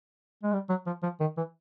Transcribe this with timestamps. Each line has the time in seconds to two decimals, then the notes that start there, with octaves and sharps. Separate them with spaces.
0.43 G#3
0.53 G3
0.69 F#3
0.86 F3
1.03 F3
1.20 D#3
1.37 E3